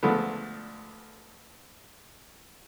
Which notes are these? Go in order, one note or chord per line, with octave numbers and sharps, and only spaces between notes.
D2 D3 F3 G#3 A3 B3